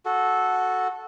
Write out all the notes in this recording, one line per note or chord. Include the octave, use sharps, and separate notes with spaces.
F#4 A4